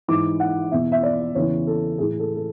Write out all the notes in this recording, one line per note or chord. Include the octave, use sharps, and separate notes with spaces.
G#2 E3 D6
F#5
E2 B2 E5
E5
D5
E2 C#3 E3 C#5
A4
A2 E3 G#4
A4
A4